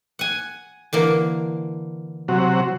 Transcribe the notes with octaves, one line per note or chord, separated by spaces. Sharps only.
F#5 G#5
D3 E3 A#3
C3 F#3 F#4